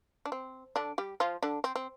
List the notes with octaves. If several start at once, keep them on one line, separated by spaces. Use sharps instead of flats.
D4
C4
D3 D4
G3 G4
F3 F4
D3 D4
C4
C4